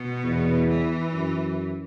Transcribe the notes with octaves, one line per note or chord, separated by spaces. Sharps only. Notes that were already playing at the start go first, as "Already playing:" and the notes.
Already playing: B2
E2
E3
F#2